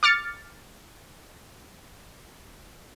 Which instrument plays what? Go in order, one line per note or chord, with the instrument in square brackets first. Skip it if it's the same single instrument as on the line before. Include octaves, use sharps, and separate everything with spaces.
[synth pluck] D6 F6 A6 C#7